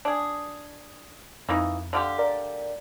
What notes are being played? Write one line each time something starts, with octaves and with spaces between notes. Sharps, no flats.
D4 G#4
F2 E3 A#3 D#4
D3 F4 G4
A#4 D5